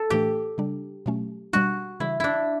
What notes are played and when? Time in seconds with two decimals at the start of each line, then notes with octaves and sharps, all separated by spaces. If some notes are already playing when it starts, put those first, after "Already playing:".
Already playing: A4
0.10 A2 E3 A3 D4 G4
0.58 C#3 G3 D4
1.06 B2 F#3 A3 C#4
1.53 B2 G3 D4 F#4
2.00 C#3 E3 G3 E4
2.20 D4 E4